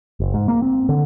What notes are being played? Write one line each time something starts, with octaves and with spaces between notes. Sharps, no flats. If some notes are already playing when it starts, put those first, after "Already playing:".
F#1
G#2
A#3
C4
D3